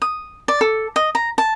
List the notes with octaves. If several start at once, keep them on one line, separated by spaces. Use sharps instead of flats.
D#6
D5
A4
D#5
A#5
A5